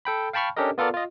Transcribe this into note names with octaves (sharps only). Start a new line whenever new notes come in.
A4 G5 B5
F5 G5 A5 B5 C#6 F6
C#4 D4 G4 A4 A#4 D#5
B3 F4 A4 A#4 D5
F4 D#5